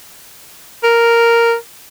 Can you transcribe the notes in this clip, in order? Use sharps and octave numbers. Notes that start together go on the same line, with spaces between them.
A#4